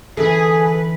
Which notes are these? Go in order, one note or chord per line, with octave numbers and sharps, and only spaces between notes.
D3 E3 C#4 G#4 A4 B4